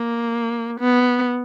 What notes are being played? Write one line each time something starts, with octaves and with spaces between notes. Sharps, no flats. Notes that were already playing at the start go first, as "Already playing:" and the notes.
Already playing: A#3
B3